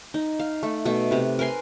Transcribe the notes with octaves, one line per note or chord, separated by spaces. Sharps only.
D#4
F5
A3
B2 A3
C3 B4
A#4 B4 G#5 C6